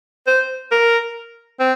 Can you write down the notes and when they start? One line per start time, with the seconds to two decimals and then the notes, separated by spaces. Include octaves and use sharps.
0.27 C5
0.72 A#4
1.60 C4